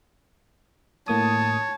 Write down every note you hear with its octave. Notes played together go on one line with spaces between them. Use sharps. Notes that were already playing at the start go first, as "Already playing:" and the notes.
A2 A#3 C#5 A5 D#6